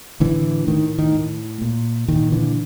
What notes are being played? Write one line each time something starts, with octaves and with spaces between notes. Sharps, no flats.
A2 D3 E3
A2 D#3
D#3
A2
A#2
A#2 D#3
D3 E3